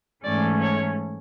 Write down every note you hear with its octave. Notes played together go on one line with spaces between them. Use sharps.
G#2 E3 A3 C#4 D5
C#5